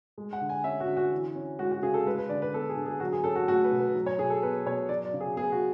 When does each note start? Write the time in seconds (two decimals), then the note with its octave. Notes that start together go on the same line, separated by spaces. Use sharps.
0.18 G#3
0.33 F#5
0.41 D3
0.49 G#5
0.64 C#4 E5
0.80 F#4
0.88 D3
0.97 F#4
1.12 E3
1.35 C#4
1.59 G#3 F#4
1.71 F#4
1.82 C#3 G#4
1.94 A4
2.06 G#3 B4
2.18 B4
2.29 D3 D5
2.42 B4
2.53 B3 A4
2.69 G#4
2.77 D3
2.86 G#4
3.00 F#3 F#4
3.12 G#4
3.24 C#4 A4
3.36 F#4
3.47 A3 F#4
3.64 B4
3.72 B2
3.79 B4
3.95 F#3
4.06 C#5
4.18 B2 G#4
4.30 A4
4.43 B3 B4
4.66 B2 C#5
4.89 F#3 D5
5.05 D5
5.13 C#3
5.20 G#4
5.36 B3 G#4
5.52 F#4